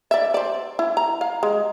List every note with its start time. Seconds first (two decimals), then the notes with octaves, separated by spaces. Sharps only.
0.11 D5 E5
0.34 C5 D5
0.79 E4
0.97 A#5
1.21 F5
1.43 G#3